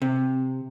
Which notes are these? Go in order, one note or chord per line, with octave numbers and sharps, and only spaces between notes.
C3